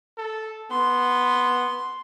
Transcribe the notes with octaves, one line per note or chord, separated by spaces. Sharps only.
A4
B3 C6